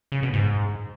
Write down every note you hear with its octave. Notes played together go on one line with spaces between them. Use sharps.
C#3
B2
G#2